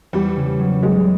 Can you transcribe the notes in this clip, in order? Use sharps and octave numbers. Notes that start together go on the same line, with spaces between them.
E2 G3
C#3
F#3
C#3 G#3